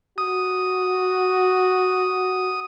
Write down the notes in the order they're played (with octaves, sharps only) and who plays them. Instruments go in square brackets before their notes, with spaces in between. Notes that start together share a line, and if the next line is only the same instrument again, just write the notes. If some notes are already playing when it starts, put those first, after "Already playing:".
[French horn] F#4 [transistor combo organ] D#6